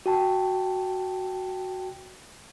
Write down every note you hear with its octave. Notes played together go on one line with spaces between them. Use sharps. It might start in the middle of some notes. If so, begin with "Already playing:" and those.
F#4 G5 A5